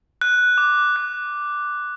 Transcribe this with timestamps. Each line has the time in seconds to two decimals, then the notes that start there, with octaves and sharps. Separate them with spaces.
0.21 F#6
0.58 D6
0.96 F#6